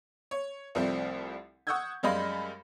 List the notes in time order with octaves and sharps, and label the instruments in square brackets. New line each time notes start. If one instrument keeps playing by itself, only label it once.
[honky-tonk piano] C#5
C2 F3 G3 A3 C4
F#5 C#6 D#6 E6 G6 G#6
F#2 G3 G#3 F5 B5 A#6